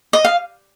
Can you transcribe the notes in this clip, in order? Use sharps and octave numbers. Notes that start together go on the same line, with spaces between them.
D#5
F5